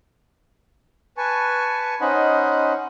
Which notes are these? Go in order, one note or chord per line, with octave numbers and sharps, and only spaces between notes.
B4 G#5 A5 C#6
C#4 D#4 C5 D#5 F#5 B5